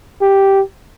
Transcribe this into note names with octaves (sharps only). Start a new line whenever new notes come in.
G4